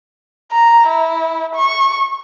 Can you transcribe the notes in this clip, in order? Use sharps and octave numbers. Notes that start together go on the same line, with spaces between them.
A#5
E4
C#6